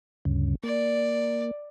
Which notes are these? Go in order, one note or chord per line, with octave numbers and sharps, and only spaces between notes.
D2 G2 C#3
A#3 D5